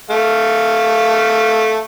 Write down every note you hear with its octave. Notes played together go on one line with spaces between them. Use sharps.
A3 F5